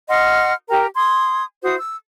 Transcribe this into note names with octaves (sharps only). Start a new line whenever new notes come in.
D#5 F#5 C6 F6
G4 A#4 G5 A#5
C6 D#6 G#6
E4 F#4 C5 D#6
E6